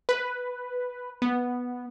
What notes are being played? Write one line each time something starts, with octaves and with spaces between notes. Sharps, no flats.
B4
B3